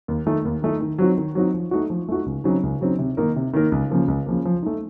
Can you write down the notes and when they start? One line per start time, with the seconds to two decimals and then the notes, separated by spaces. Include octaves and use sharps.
0.08 D#2
0.26 D#3 A3 D#4
0.45 D#2
0.62 D#3 A3 D#4
0.81 D#3
0.98 F#3 C4 D#4 F#4
1.18 D#3
1.35 F#3 C4 D#4 F#4
1.54 F3
1.71 A3 D#4 F#4
1.90 F3
2.08 A3 D#4 F#4
2.26 C#2
2.44 C#3 F#3 C4 D#4
2.63 C#2
2.81 C#3 F#3 C4 D#4
2.99 C3
3.17 D#3 A#3 D#4 A#4
3.36 C3
3.54 D#3 A#3 D#4 A#4
3.72 C#2
3.90 C#3 F3 A#3
4.08 C#2
4.26 C#3 F3 A#3
4.45 F3
4.63 A3 D#4